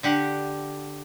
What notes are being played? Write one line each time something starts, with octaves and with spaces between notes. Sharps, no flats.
D3 G4 F#5